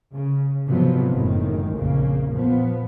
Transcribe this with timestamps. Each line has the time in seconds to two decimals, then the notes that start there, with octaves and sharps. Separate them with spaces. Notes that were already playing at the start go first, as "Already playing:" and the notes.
0.15 C#3
0.68 F2 G#2 C3 F3 F#3 B3
1.13 F#1 F#2 A2 D#3 G#3
1.75 A#1 F2 C#3 A#3
2.32 A#2 F3 B3